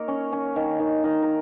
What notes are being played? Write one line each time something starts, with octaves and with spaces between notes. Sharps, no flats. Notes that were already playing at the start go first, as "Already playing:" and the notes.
Already playing: A#3 D#4 A#4 C#5
C#4
C#4
D#3
D#3
D#3 D#5
A#4